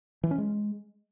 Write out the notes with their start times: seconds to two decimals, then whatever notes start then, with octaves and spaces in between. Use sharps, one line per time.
0.23 E3
0.31 C#4
0.38 G#3